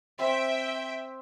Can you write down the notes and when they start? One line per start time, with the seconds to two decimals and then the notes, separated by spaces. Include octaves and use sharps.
0.19 C4 E5 G5 C6